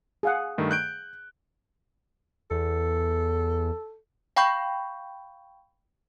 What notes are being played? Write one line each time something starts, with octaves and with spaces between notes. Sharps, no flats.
G#4 F5 F#5
G2 D#3 A3
F#6 G6 D7
E2 A4
F5 G5 B5 C#6 G6